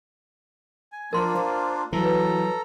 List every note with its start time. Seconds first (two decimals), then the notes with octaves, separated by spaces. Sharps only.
0.92 G#5
1.13 F3 A#3 D4 F4 A#4 C6
1.37 C5
1.93 E3 F#3 A4 A#5
2.04 B4